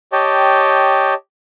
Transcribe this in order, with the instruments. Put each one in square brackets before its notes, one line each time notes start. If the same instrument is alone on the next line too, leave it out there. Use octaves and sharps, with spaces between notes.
[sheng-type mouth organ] G4 C#5 D#5 G5 A5